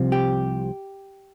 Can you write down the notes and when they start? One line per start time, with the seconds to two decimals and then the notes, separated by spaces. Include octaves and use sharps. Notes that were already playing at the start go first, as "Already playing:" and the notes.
Already playing: C2 C3 F3 C4
0.12 G4